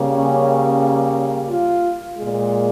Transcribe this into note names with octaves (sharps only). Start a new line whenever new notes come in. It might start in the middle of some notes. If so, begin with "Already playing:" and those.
Already playing: C#3 G3 A#3
C#4
F4
A#2 G#3